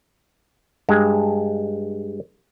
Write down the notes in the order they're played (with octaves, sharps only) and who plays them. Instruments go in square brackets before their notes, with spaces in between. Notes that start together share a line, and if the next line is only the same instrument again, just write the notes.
[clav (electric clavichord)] G2 G#3